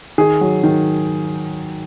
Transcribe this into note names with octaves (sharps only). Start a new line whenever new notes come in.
D#3 G#4
F#3
D#3